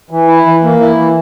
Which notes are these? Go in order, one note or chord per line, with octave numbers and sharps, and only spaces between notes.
E3
E4
E3
A#3
E4
E3